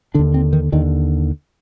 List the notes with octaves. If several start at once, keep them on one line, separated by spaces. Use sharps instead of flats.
D#2 D3 D4
C4
D#3
D#2 D3 D#3